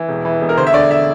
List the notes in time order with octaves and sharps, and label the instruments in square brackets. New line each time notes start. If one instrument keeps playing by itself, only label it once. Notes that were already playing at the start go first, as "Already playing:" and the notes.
Already playing: [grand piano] E3
E1
E3
E1
A#4
D2 C5
E5
D3 D5
E5